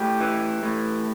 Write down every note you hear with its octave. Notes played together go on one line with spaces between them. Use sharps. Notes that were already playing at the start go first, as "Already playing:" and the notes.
Already playing: A2 G4
E3
A2